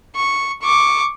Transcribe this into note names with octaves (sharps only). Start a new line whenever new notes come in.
C#6
C#6 D6